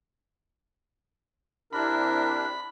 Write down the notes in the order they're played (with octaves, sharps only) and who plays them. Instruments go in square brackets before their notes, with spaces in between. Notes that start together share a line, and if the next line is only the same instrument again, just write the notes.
[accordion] C3 D4 [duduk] E4 [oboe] A#4 [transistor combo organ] B5